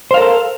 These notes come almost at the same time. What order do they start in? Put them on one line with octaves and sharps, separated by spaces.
C5 F5 A#4 A4